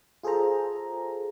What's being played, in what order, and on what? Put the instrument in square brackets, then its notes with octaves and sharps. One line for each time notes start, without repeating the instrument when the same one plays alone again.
[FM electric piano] F4 G#4 A4 C5 A#5